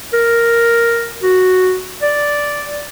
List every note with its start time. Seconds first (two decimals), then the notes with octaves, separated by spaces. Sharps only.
0.13 A#4
1.23 F#4
2.02 D5